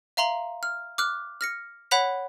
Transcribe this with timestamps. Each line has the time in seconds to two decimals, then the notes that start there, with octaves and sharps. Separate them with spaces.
0.17 E5 F5 A#5 C6 F#7
0.63 F6
0.98 D6 F6 F#6
1.41 F6 A#6 C#7
1.91 C#5 F#5 B5 F#6 B6 F7